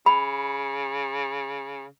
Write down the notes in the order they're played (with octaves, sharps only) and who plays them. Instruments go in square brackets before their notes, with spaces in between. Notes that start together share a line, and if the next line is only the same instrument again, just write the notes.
[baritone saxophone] C#3 [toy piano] B5